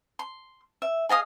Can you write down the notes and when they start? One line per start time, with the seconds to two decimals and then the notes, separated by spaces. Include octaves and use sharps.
0.19 C6
0.82 E5
1.09 G#4 D#5 F5 D#6